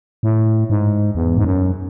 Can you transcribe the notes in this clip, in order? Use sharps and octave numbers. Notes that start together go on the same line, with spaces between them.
A2
G#2
E2
G#2
F#2